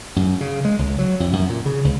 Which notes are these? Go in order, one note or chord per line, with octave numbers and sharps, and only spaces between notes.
F#2
C#3
G#3
C#2
F#3
F2
F#2
A#2
C#3
C#2